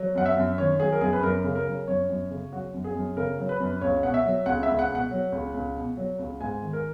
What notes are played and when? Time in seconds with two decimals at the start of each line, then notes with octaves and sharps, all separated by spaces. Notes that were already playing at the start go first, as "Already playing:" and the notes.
Already playing: F#3
0.15 F#2 F#5
0.26 E5
0.37 F#2
0.58 D#3 C#5
0.80 F#3 G#4
0.92 A#4
1.01 F#2 G#4
1.13 B4
1.23 F#2 A#4
1.44 C#3
1.55 A#4
1.66 F#3
1.87 F#2 C#5
2.09 F#2
2.31 C#3
2.52 F#3 F#4
2.74 F#2
2.84 G#4
2.96 F#2
3.17 C#3 A#4
3.38 F#3
3.49 B4
3.60 F#2
3.81 C#2 C#5
4.03 B2 F#5
4.14 E5
4.25 F#3
4.46 C#2 F#5
4.63 E5
4.69 C#2
4.79 F#5
4.90 B2
4.95 F#5
5.11 F#3
5.32 C#2
5.54 C#2
5.76 B2
5.97 F#3
6.19 C#2
6.41 G#2 G#5
6.62 D#3
6.73 A#4